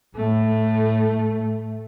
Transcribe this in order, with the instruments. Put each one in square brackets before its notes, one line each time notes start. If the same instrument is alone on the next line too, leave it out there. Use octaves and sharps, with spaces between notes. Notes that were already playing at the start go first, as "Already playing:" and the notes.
[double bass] A2 A3